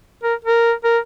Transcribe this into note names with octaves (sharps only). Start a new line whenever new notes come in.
A#4
A#4
A#4